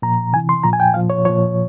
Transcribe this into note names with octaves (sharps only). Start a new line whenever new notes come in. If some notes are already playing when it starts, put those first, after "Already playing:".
A#2 F3 A#5
C3 E3 G#5
C6
A#2 F3 A#5
G#5
G5
A#2 F3 F5
C#5
A#2 F3 C#5